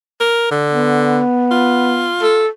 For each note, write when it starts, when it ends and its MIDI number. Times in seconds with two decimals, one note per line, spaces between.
0.20 0.48 70
0.51 1.21 50
0.71 2.11 59
1.51 2.46 65
2.22 2.48 69